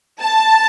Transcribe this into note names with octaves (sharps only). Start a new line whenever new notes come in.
A5